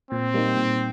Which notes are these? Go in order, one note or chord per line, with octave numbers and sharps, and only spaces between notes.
A#2 C4
G3 A#3 D#4
A#2